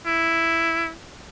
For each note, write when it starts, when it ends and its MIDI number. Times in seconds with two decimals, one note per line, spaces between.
0.06 0.90 64